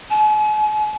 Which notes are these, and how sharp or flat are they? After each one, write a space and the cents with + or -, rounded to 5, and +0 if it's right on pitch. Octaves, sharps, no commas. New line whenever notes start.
G#5 +45